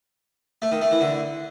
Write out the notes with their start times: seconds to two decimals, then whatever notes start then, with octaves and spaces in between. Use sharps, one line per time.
0.62 A3
0.72 D#3
0.81 A3
0.91 E3
1.01 D3